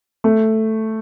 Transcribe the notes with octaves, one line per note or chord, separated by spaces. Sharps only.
A3